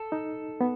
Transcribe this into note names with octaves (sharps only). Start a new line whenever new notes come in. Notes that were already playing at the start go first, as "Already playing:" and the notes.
Already playing: A4
D#4
B3